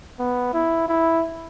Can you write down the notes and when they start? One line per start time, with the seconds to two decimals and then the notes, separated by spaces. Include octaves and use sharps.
0.19 B3
0.54 E4
0.89 E4